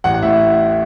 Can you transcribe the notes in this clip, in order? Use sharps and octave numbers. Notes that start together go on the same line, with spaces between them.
A1 F#5
F#5
A2 E5